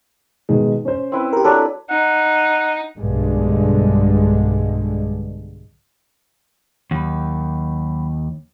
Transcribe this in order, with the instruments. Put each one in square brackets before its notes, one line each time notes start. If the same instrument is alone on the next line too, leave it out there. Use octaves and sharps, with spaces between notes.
[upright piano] B2 D#3 G#3
C#4 C5
[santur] C4 E4 B4
[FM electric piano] G4 A#4
[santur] F#3 D4 E4 [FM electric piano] A4
[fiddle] D#4 [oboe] F#5
[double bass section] B1 G2 D3 G#3
[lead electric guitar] D#2 [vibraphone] F#3 B5